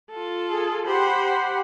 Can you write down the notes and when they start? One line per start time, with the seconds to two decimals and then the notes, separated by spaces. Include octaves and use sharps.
0.11 F4 A4
0.50 G#4
0.86 G4 C5 F#5 B5